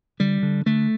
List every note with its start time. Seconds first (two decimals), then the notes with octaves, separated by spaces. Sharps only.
0.20 D3 G3
0.43 D3
0.66 D3 A3